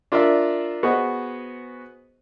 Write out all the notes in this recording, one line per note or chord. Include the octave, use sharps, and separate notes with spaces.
D4 F4 A#4 D5 E5
B3 F#4 G#4 C5 D#5